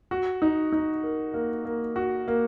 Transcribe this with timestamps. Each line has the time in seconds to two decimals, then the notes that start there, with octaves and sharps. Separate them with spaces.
0.11 F#4
0.42 D#4
0.73 D#4
1.03 A#4
1.34 A#3
1.65 A#3
1.96 F#4
2.28 A#3